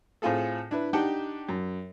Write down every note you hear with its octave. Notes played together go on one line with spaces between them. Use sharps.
A2 C4 F4 G#4 A4
D4 E4 B4
D4 D#4 G4 F#5 G5 A5
F#2